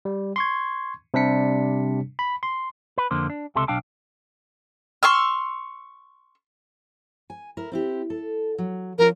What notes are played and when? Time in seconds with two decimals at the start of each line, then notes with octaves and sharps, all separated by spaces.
0.05 G3
0.36 C6 C#6 G#6
1.14 C3 G3 D4 B6 C#7
2.19 B5
2.43 C6
2.98 B4
3.11 F2 D3 A#3 C5
3.30 D4
3.55 C#2 C3 A4 E5 C6
3.68 B1 D4 F5 G5 A5
5.03 C6 C#6 E6 F6
7.30 G#5
7.57 E4 A#4
7.72 C4 E4 G4
8.10 A4
8.58 F#3
8.98 F3 C#4 F4 A#4